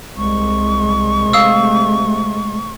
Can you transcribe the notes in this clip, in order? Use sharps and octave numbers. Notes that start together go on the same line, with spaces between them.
C2 G#3 C#6
C3 A3 F5 D#6 E6